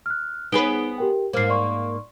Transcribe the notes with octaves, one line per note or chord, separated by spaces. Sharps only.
F6 F#6
B3 D#4 G#4 B4 D7 G7
G4 A#4 G5
G#2 A#3 C5 F6 C7
D5 C6 C#6